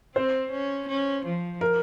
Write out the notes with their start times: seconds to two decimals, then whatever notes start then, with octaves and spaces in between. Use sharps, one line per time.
0.15 C4 C5
0.52 C#4
0.89 C#4
1.25 F3
1.61 A#4